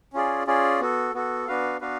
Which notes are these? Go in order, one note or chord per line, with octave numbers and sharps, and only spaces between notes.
C#4 F4 G#4 D5
C#4 F4 G#4 D5
B3 F#4 A4
B3 F#4 A4
B3 D4 F#4 B4 F5
B3 D4 F#4 B4 F5